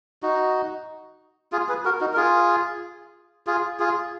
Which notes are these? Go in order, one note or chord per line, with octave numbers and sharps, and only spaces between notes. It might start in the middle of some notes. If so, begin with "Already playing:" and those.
D#4 F#4
F4 G#4
G#4 B4
F#4 A#4
D#4 F#4
A#4
F4 G#4
F4 G#4
F4 G#4